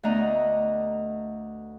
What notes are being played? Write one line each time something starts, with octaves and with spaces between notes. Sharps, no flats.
D2 A3 B3 D4 D#5 A#5